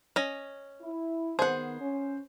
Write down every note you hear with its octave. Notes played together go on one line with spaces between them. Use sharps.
C#4 D#5
E4
D#3 B3 G#4 C5 F#5
C#4